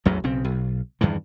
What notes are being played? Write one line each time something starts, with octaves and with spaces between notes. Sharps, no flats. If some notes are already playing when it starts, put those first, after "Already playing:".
A1 E2 G#2 F#3
B1 C#3 C4
B1
E2 G2 D#3 E3